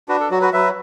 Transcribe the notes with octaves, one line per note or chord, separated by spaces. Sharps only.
D4 F#4 B4
A4
F#3 F#4
F#4 B4
F#3 B4 E5